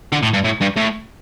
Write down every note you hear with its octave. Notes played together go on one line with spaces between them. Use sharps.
D3
A2
G2
A2
G2
A2